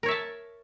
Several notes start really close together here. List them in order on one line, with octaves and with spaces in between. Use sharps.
A#4 C#5 E5 A5